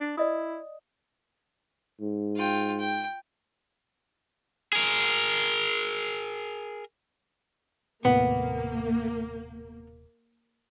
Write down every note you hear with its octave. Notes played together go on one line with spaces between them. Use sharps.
D4
E4 D5 D#5 D#6
G#2
F4 G5
G5
G#4 A#4
D#1 A2 C3 A#3 B3